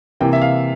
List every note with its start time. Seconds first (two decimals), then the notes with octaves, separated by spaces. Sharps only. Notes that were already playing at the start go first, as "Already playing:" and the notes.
0.20 C3 E3 A#3 G5
0.33 E5
0.42 F5